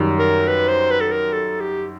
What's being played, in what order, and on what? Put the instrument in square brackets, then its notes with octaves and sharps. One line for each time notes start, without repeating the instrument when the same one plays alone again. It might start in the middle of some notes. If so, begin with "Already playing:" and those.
Already playing: [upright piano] F#2 D#3 G3
[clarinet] A#4
B4
C5
B4
A4
A#4
A4
G4